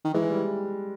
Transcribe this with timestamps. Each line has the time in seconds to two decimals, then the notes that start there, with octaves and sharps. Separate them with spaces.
0.05 D#3
0.14 E3 G#3
0.30 G3